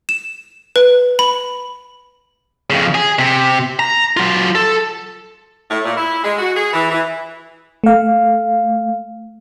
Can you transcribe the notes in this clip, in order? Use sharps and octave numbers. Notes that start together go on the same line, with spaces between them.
E7
B4
B5
F2 C#3
G#4
C3
A#5
F#3 F4
A4
A2
A#2
E4
G#3
F#4
G#4
E3
E3
A3 F5